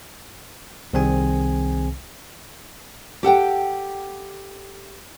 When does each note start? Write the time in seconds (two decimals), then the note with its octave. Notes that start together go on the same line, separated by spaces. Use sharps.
0.93 C2 C3 D#3 C4 G#4 G#5
3.23 G4 A4 F#5 G5